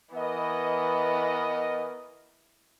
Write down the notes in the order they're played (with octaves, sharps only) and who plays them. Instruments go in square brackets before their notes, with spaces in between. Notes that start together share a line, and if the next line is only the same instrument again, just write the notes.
[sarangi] E3 [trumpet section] B3 A#4 D#5